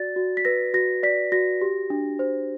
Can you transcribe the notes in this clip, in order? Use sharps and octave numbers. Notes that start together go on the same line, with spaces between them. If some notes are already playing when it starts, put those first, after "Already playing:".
Already playing: F#4 D5 A6
F#4
B6
B4 A#6
F#4 A#6
D5 B6
F#4 A#6
G4
D4
C5